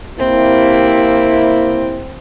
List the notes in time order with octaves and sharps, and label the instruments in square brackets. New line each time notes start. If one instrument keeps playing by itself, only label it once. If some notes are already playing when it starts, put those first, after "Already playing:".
[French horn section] C3 A#3 E4 [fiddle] C4